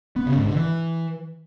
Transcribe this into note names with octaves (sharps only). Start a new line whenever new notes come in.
B3
C#3
G#2
D3
E3